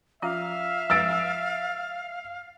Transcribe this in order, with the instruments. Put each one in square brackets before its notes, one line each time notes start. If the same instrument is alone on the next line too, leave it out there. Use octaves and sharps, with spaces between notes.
[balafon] F3 C#4 F4 [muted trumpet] E5 [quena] F5
[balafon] F3 G#3 B4 [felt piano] E6 A6 D7